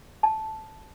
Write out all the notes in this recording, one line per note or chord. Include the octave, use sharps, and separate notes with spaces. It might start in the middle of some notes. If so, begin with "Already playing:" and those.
A5